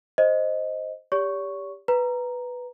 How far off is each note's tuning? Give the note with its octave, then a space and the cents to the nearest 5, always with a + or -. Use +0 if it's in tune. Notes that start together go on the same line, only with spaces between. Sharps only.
C5 +0 D#5 +0
G4 +20 C#5 +45 C#6 +0
B4 +0 A#5 +0